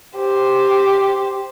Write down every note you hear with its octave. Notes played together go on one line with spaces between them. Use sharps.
G4 C5